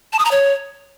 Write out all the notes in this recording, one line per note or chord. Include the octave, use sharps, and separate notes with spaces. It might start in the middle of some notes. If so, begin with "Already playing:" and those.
A5
D#6
A#5
C#5